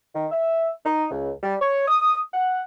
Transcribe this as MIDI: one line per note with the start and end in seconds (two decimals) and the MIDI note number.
0.15 0.26 51
0.32 0.69 76
0.85 1.06 63
1.11 1.30 37
1.43 1.55 55
1.61 1.86 73
1.88 2.19 87
2.34 2.62 78